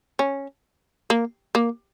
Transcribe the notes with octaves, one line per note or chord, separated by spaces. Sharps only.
C#4
A#3
A#3